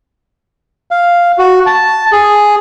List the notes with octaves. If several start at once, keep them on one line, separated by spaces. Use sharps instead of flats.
F5
F#4
A5
G#4